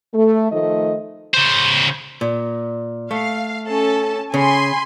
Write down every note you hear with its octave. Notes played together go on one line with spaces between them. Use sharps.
A3
D#3 F3 A3 D#5
C#3 C5
A#2
A3 F5
C#4 A4 A5
C#3 G#5 B5 C6